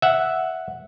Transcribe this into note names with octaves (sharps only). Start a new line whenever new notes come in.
E5 F#5